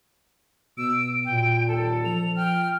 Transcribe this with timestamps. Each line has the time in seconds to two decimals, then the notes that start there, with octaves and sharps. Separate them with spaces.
0.78 B2 E6 D7
1.25 A#2 G5
1.68 D#1 A4
2.05 F3 F7
2.36 G5 F6